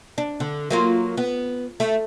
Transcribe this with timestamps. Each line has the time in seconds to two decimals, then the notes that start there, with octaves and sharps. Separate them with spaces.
0.18 D4
0.40 D3
0.71 F#3 A#3 F4
1.17 B3
1.80 A3